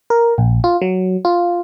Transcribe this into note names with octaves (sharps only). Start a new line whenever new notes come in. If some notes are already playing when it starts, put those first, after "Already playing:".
A#4
A#1
F4
F#3
F4